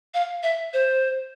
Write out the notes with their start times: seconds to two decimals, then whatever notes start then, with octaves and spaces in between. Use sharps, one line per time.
0.14 F5
0.43 E5
0.73 C5